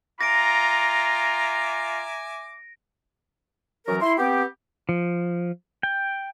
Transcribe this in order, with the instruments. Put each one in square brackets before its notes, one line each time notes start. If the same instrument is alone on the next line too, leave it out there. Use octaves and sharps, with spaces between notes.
[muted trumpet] F4 [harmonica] E5 G#5 D6 [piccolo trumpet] A#5 [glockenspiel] A#6 D7
[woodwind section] F#2 E3 F#3 A#4
E4 C6
B3 C4 G4
[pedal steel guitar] F3
G5